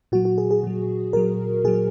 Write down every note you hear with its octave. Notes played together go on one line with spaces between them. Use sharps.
A#2 F#3 F#4
F#4
G#4
G#4
A#2 F#3
A#2 F#3 A#4
A#2 F#3 G#4